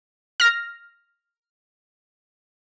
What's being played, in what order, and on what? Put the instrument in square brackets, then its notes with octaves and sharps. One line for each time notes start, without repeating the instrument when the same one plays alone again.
[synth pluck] F6 A#6